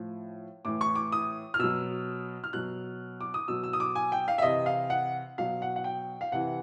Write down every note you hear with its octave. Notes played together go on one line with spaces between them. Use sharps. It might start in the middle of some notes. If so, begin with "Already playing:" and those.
Already playing: A2 F3
A2 E3 D6
C#6
D6
D#6
F6
B2 F#3 E6
F6
B2 F#3 F#6
D6
D#6
B2 F#3 E6
E6
D#6
D6
G#5
G5
F5
E5
C3 E3 D#5
F5
F#5
B2 F#3 F5
F#5
F#5
G5
F5
C3 E3 F#5